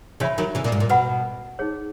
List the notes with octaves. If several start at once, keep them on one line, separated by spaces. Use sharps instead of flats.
C#3 E3 F#4 C#5 E5 B5
D#3 F#3
C#3 E3
A#2
G#2
A#2
B2 B4 F#5 B5
D#4 G#4 C#5